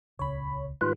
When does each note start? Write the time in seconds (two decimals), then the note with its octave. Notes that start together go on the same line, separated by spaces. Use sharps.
0.19 D#1 C#2 C#3 C#5 B5
0.81 G#2 D#3 G3 F4 B4